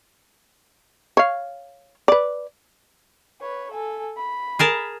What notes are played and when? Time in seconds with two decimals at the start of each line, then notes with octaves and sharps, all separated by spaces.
1.17 C#5 F5
2.08 B4 D5
3.41 B4 C#5
3.71 A4 G#5
4.17 B5
4.59 G#4 A#4 A5